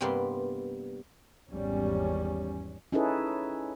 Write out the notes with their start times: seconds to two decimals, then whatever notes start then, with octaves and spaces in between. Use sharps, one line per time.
0.01 G2 C3 G3 A#3 B3 C6
1.51 G#1 E2 G3 C#4
2.92 C#4 D#4 E4 G#4 A4 B4